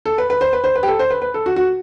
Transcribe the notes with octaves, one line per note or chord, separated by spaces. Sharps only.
A4
B4
B4
C5
B4
C5
B4
G4
A4
C5
B4
B4
A4
F#4
F#4